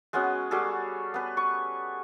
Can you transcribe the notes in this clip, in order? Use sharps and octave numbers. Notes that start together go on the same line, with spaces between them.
G#3 B3 C#4 F#4
G3 F#4 G#4 A4
B3 B4
C#6